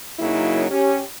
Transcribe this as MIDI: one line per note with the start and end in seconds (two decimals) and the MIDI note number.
0.19 0.66 42
0.19 0.66 49
0.19 0.66 54
0.19 0.66 58
0.19 0.66 63
0.19 0.66 64
0.71 1.00 61
0.71 1.00 67